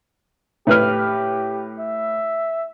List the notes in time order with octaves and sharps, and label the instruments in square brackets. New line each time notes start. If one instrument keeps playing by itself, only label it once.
[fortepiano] A2 B4 F6 [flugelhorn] G4
[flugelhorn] E5